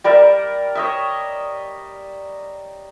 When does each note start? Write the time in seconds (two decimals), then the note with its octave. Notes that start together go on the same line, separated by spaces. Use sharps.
0.04 G3 A#4 D5 E5
0.75 C#5 D#5 E5